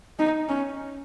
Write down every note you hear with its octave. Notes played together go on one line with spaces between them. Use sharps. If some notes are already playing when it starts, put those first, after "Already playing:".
D#4
C#4